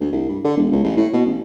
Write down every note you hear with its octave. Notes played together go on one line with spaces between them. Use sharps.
D2
C2
G2
D3
E1
C#2
A1
A2
B2
A1